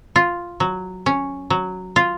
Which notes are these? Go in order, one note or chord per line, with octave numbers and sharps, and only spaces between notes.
F4
F#3
C#4
F#3
F4